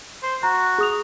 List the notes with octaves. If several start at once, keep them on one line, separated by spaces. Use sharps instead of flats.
C5
F#4 A#5
G#4 D#6 F7